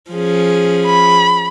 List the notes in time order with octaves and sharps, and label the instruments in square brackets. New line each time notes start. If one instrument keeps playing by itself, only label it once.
[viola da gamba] F3 C#4 G#4
[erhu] B5